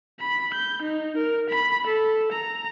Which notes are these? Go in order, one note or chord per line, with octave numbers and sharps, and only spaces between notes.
B5
G6
D#4
A#4
B5
A4
A#5